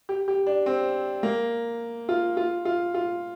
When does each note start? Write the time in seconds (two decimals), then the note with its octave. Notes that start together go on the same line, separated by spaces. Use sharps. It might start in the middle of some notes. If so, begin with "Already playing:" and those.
0.09 G4
0.28 G4
0.47 D4
0.66 C4
1.23 A#3
2.09 F4
2.37 F4
2.65 F4
2.94 F4